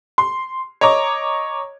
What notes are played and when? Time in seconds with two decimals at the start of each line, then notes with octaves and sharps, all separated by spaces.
0.18 C6
0.81 C#5 D#5 A#5 D6